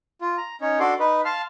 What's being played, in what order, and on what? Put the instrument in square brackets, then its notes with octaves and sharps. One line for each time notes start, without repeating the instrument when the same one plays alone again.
[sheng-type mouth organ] F4
A#5
C#4 D#4 C#5
D4 F#4 A4 D5 C6
D#4 B4
F5 A5 C6 F6